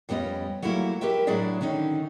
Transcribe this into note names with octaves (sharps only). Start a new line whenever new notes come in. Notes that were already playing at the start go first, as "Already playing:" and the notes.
F2 G3 B3 C#4 D#5
F#3 G3 A3 A#3 E4
G4 A#4 B4 E5 G5
A2 F#3 D4 E4 G#4 D5
D3 D#3 C#4 D#4